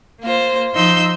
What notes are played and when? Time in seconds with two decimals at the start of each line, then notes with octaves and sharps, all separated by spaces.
0.21 A#3 F4 C5
0.74 F3 D#4 C6 E6 G6